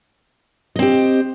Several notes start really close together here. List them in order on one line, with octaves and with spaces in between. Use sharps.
D#5 C4 G4